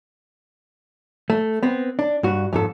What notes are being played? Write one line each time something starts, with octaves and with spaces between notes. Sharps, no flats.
A3
B3 C4
D4
G2 F#4
F2 G#2 A4